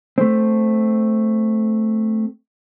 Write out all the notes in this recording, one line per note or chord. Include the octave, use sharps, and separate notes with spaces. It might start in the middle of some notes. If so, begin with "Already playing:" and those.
A3 C4